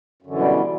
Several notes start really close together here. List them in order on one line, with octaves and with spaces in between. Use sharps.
F#2 D3 E3 B2 G3